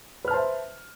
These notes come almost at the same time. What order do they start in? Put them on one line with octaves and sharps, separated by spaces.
B4 F6 A5 C5 E5